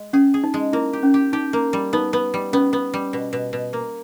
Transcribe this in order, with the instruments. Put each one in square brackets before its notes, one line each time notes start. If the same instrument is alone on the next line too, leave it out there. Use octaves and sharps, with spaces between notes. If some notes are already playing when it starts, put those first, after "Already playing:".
Already playing: [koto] G#3
[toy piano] C#4 [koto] G#4
[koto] G#4
[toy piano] D#4
[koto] G#3
[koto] A#3 [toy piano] E4
[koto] G4
[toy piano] C#4
[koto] G4
[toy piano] D#4 [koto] G4
[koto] A#3
G3
[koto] B3 [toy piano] D#4
[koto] B3
G3
[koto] B3 [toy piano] C#4
[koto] B3
G3
B2
B2
B2
A#3